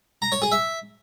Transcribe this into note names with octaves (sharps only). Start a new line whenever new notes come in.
A#5
C#5
G#4
E5